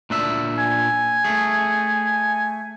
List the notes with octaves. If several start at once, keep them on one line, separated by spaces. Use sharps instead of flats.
A#2 D4 E5
G#5
A3 G#4